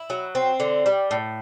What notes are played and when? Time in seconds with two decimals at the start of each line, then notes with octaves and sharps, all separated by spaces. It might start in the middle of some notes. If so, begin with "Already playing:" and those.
Already playing: E4
0.10 F#3
0.35 C4
0.60 D3
0.86 G3
1.11 A2